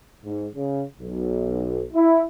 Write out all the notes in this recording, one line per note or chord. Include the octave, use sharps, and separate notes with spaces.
G#2
C#3
B1
E4